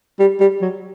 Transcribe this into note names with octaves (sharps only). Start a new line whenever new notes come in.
G3
G3
F#3